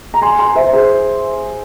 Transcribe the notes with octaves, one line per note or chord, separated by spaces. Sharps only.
A#5
G#5 C6
G#5 C6
C5 E5
G#4 C5